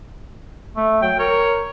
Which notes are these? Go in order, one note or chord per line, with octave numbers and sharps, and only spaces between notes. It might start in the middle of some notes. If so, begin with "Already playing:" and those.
A3
F#3 G5
A#4 C#5